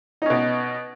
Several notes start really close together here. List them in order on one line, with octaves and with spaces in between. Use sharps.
D#4 C#4 B2